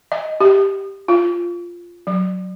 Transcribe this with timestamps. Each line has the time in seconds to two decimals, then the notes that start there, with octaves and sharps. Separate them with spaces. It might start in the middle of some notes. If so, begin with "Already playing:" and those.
0.12 D#5
0.40 G4
1.08 F4
2.07 F#3